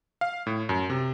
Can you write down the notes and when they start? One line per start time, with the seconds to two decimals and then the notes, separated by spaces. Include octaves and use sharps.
0.21 F5
0.47 A2
0.69 F#2
0.90 C3